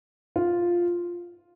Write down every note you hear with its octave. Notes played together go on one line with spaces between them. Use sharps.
F4